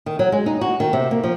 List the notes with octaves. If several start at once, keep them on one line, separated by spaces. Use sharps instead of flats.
D#3
F#3
G#3
D#4
F#4
D#3
C3
A#3
F3